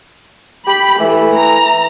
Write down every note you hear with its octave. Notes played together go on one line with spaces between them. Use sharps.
G4 B5
E3 A3
A#5